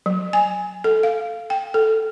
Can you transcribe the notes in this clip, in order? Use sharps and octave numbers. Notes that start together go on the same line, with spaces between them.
F#3
G#5
A4
F5
G5
A4